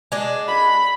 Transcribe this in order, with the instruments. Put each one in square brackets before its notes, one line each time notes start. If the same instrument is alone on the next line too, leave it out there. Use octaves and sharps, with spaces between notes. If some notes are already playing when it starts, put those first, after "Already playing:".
[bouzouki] G#3 D4
[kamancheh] B5